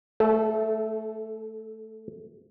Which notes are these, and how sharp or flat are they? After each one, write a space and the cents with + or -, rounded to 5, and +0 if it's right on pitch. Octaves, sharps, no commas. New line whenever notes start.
A3 +0 A4 -30